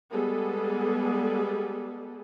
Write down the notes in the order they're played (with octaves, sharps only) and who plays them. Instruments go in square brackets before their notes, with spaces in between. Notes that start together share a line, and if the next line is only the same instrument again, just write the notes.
[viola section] G3 G#3 B3 G#4 A4